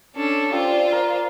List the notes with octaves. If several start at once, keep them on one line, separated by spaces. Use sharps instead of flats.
C#4 D4 A4
F4 G4 C5 D5 E6
A#4 G#5